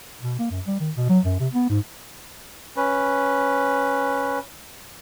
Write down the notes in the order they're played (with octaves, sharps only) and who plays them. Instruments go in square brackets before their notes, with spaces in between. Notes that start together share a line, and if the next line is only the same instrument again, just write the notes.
[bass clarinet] B2
A#3
F#2
G3
D#3
B2
F#3
F#2
C3
B3
G#2
[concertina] C#4 B4